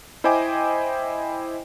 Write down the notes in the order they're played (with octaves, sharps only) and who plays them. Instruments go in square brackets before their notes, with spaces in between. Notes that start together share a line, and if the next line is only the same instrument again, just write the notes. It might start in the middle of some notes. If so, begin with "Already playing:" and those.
[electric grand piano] E4 C5 D#5 G5 G#5 D6